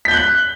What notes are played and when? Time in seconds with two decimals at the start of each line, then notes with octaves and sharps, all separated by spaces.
0.05 B6
0.08 G6
0.11 G7
0.14 F#6
0.17 F#7